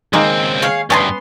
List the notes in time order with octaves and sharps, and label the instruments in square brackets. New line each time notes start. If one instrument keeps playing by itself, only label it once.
[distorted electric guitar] C#2 C4 [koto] D#3 G#3 A#3
[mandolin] G#4 C#5 F5
[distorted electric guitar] D2 G2 [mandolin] B3 A5 C6 [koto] C#4